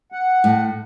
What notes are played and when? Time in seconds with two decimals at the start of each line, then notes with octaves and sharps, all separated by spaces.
0.12 F#5
0.44 A2